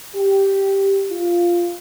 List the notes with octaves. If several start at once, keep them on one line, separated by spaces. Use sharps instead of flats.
G4
F4